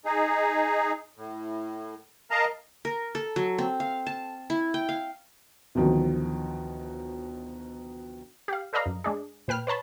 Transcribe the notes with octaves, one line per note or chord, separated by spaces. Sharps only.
D#4 G#4
A2
A#4 D#5 F5 A5 A#5
A#4
A4
F#3
C4
F5
A5
E4
G5
F5
D2 B2 D#3 F3 F#3
G4 F5
A4 B4 D5 D#5 F5 A#5
F#2
G#3 D4 G#4
A#2 B4 G5 F6
B4 C#5 A5 B5